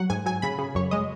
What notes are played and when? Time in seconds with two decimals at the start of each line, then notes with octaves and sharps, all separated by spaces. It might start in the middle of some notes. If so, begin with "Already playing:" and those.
Already playing: F#3 F#5
0.10 G#2 G#5
0.26 F#3 G#5
0.42 C#3 B5
0.58 C#3
0.75 F#2 C#5
0.91 G#3 D#5